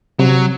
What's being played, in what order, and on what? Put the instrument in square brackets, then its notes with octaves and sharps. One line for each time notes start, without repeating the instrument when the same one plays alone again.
[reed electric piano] C3 [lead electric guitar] F#3